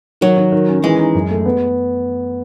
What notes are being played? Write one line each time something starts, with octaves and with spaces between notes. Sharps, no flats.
D#3 F#3
D#3
D#3
C#4
E3 G#3
D#4
F#2
A3
B3